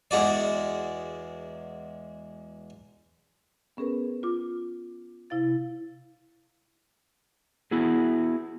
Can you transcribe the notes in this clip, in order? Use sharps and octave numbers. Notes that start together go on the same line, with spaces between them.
E2 G#3 F#4 D5
B3 C#4 G#4 A#4 B4
F4 D6
C3 E4 F5 A6
B3 E4 F#4 G#4